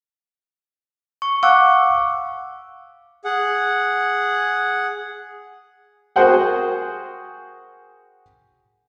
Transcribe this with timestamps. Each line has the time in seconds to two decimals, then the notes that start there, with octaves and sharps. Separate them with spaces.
1.22 C#6
1.43 F5 F#5 C#6 D6 E6 F#6
3.25 G#4 F#5
6.16 F#4 G#4 A#4 C5 F#5 G5